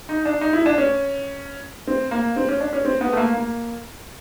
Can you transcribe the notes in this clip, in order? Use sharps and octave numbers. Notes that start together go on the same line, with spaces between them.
D#4
D4
D#4
E4
D4
C#4
C4
A#3
C4
C#4
D4
C#4
C4
B3
A3
A#3
A#3